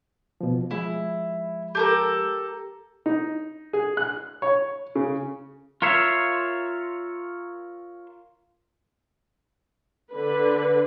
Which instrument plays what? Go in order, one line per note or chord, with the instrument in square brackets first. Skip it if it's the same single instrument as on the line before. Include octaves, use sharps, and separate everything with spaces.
[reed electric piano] B2 F3
[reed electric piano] F3 G#3 [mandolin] E4
[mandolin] G4 A4 A#4
[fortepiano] D#4
G#4
F#6
C#5
C#3
[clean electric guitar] F4 A#4 C#5 E5 F5
[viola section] D3 B4